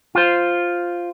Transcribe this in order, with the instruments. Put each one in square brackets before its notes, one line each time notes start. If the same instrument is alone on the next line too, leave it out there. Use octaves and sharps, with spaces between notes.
[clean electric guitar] F4 C5